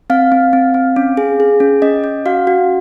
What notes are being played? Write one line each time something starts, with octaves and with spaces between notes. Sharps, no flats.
C4 F5
C4
C4
C4
C#4
G#4
G#4
C#4
C#4 D#5
C#4
F#4 F5
F#4